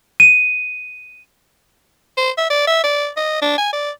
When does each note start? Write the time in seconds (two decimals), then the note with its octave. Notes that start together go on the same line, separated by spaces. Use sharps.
0.20 D#7
2.17 C5
2.38 E5
2.50 D5
2.67 E5
2.84 D5
3.17 D#5
3.42 D4
3.58 G#5
3.73 D5